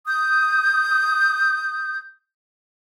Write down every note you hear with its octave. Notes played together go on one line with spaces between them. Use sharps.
D#6 G6